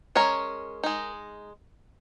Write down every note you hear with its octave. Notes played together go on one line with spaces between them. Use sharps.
G#3 C#4 A#4 C#5
G#3 D#4